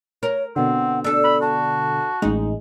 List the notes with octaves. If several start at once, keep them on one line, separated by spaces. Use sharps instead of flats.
A#4 C#5
B2 D3 C4 F#5
D4 A4 E6
B5
F#4 A5
A1 G#3 D#4